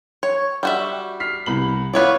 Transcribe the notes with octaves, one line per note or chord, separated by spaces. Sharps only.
C#5
G3 F#4 E5
F6 B6 C7
C2 B5 F#7
B3 E4 F4 C#5 D5